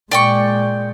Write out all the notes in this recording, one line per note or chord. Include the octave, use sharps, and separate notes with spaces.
A#2 G#3 D5 G5 C#6